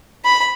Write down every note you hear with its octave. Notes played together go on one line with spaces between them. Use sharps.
B5